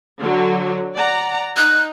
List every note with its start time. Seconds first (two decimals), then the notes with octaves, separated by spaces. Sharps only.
0.19 D3 F#3
0.94 D5 F#5 A#5
1.57 D#4 F#6